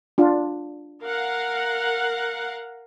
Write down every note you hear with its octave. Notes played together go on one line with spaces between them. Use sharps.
D4 F4
A#4 F5 F#5